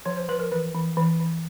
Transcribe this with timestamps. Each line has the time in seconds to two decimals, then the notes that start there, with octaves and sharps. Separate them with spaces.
0.05 F3 C#5
0.17 C5
0.28 F3 B4
0.40 A#4
0.52 E3 B4
0.74 E3
0.97 E3
1.20 E3